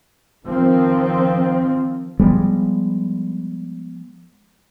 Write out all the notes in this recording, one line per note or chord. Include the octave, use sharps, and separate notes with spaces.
D#3 F3 C4
F3 G3 G#3 B3